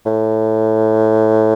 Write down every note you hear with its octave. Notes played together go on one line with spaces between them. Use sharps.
A2